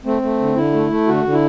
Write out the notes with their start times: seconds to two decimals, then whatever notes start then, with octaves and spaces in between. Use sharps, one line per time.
0.04 A3 C4
0.22 A3
0.39 D3
0.55 D3 E4
0.73 A3
0.90 A3
1.07 D3 F#4
1.24 D3
1.33 E4